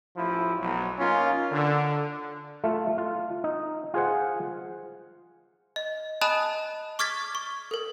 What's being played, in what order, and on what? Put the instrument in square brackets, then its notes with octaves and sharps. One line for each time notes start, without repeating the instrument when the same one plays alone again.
[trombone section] A1 F3 E4
B1 F#3
A#3 C#4 D#4 F4
D3
[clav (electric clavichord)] A3 F4
F4
D#4
F4 G#4 C5 F#5
[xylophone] D#5
D#5 G#5 A5 B5 D#6 F#6
C#6 D6 F6 G#6 A6 B6
C#6
A4 A#4